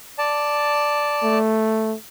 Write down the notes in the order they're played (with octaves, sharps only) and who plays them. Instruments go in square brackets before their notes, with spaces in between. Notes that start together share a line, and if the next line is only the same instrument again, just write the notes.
[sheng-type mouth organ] D5 A5
[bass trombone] A3